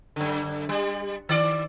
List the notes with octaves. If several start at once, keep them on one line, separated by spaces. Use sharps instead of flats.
F#2 D3
G3
D#3 D5